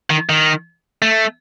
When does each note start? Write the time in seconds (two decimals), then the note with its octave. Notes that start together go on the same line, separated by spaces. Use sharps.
0.10 D#3
0.29 D#3
1.02 A3